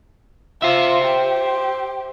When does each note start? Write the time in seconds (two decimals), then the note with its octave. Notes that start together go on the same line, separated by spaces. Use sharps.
0.62 F4 C5 E5
1.04 G4